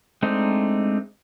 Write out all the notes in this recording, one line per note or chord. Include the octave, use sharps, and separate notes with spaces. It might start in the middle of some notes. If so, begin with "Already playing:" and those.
G#3 A3 C4 D4 D#4